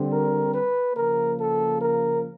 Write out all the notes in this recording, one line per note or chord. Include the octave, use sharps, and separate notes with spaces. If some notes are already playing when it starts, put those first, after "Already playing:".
Already playing: D3 G3 C4
A#4
B4
C#3 F3 A#3 A#4
A4
A#4